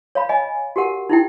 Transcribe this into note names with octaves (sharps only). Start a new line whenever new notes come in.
C#5 F5 B5
D#5 G#5
F#4 G4 A#4 F#5
D#4 E4 G5